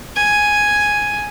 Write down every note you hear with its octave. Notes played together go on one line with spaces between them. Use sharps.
G#5